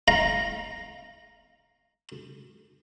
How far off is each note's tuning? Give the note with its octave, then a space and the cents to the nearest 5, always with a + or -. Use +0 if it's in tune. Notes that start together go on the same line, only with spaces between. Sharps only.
F5 +0 A#5 -5